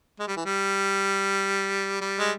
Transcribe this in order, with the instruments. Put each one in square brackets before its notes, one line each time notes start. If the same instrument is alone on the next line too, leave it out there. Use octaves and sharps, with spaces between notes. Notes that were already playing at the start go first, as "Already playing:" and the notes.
[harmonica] G#3
G3
E3
G3
G3
G#3